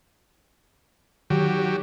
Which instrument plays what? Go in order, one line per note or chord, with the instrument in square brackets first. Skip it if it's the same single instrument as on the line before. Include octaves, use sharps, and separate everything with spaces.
[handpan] D#3 [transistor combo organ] F#3 G4